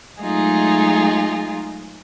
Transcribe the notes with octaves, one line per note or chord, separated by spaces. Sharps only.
F#3 G#3 A3 D#4 F4 G#4